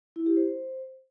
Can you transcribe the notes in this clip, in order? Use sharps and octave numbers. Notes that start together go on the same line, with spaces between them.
E4
G4
C5